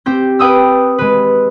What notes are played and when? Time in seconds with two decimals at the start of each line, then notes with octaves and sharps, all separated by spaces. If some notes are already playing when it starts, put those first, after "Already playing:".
0.06 C4 G4 G6
0.39 B4 G5 D#6 E6
0.98 G#3 B4